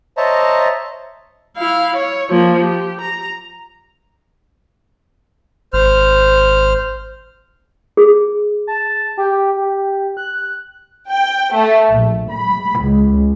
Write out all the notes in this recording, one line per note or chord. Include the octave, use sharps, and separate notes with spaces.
C5 C#5 D#5 E5 A5 A#5
E4 F5
C#5
F3 A#3
G4
A#5
G#1 C5 F6
G#4
A5
G4
G4
F#6
G5
A3
A#1
B5
C#2